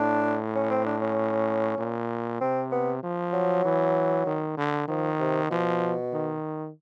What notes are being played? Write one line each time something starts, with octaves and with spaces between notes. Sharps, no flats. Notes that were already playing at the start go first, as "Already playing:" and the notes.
Already playing: A2 D4
C#4
C4
D4
C#4
A#2
C3 C4
B3
F3
F#3
E3
D#3
D3
D#3 F3
C3
B2 F3
D#3